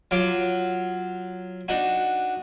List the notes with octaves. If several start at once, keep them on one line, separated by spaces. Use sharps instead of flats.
F#3 F4 F5 D6
D4 D#4 F#4